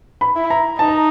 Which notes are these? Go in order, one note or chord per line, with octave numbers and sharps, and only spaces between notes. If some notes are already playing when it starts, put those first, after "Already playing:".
B5
E4
A#5
D#4 A5
A#5